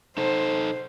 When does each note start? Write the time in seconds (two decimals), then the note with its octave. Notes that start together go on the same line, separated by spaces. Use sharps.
0.18 D#4 A4 C5